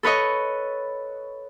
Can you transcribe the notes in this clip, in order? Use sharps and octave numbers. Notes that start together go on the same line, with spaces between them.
A4 B4 C#5 D#5